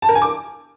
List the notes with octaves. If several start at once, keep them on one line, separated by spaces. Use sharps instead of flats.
A5
A#4
G#5
D6